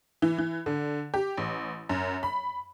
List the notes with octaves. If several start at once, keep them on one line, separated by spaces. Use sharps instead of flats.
E3
E3
D3
G4
A1
F#2
B5